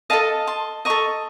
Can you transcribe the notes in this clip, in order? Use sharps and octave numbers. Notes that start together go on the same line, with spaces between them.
A4 D#5 F5 A5
A5 C6
A4 D#5 A#5 C#6